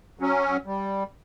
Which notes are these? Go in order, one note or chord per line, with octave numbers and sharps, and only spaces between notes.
F#3 C#4
G3